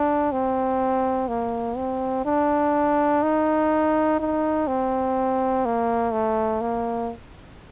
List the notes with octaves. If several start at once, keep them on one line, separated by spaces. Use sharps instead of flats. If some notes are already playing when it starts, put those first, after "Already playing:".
Already playing: D4
C4
A#3
C4
D4
D#4
D#4
C4
A#3
A3
A#3